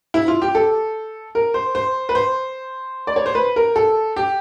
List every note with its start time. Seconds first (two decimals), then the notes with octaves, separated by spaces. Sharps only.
0.14 E4
0.28 F4
0.42 G4
0.55 A4
1.35 A#4
1.54 C5
1.75 C5
2.09 B4
2.15 C5
3.07 D5
3.16 C#5
3.26 C5
3.35 B4
3.56 A#4
3.76 A4
4.16 G4